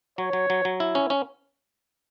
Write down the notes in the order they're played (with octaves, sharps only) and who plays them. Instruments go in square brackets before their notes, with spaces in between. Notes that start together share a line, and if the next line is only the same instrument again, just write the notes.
[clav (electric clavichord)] F#3 [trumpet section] C#5
[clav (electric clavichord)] F#3
F#3
F#3
E4
C#4
C#4